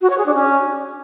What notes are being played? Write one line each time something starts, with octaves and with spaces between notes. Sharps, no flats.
F#4
C#5
G#4
D4
C#4